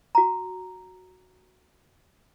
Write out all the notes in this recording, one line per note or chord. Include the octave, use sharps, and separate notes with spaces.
F#4 A#5